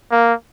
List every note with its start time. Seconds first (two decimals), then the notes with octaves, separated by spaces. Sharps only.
0.11 A#3